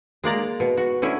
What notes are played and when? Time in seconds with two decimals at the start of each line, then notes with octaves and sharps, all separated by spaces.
0.24 G#3 A#3 D5 A#5
0.60 B2
0.77 F#4
1.02 D3 C#4 E4 G#5